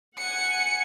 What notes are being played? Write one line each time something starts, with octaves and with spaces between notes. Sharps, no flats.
F#5 G#5 C#7